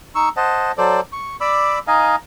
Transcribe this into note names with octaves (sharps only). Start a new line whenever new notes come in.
D#4 C#6 E6
C5 D#5 F#5 A5
F#3 A4 C5 D5
C#6
D5 B5 D6 E6
D#4 D#5 F5 G#5